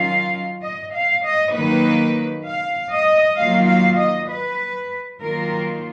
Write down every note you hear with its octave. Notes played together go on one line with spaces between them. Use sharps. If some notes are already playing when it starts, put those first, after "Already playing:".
Already playing: D#3 F#3 C#4 F4 F5
D#5
F5
D#5
D#3 F#3 A#3 D#4 B4
F5
D#5
D#3 F#3 A#3 F4 F5
F5
D#5
B4
D#3 F#3 A#3 F4 A#4